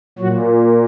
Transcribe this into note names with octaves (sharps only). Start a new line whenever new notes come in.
A#2 F#3 F#4